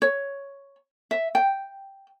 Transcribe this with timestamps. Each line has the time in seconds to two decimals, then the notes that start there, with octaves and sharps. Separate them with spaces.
0.02 C#5
1.11 E5
1.35 G5